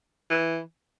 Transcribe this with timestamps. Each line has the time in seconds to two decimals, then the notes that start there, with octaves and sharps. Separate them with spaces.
0.30 E3